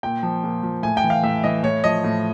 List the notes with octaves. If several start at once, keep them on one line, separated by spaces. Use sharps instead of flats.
A#2 G5
F3
A#2
F3
A2 G#5
G5
E3
F5
A2 E5
E3 D#5
A2 C#5
F3 D#5
A2